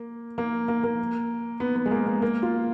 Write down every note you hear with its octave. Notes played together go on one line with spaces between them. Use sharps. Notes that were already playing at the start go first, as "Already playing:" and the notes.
Already playing: A#3
A#3
A#3
A#3
B3
B3
G#3
A#3
A#3
A#3
F4